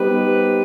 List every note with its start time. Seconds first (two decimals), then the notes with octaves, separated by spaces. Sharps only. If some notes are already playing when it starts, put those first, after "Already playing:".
Already playing: G3 B3 D#4 G4 B4 C5